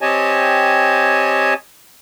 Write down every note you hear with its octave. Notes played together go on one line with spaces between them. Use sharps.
C4 G4 C#5 D#5 G#5 A5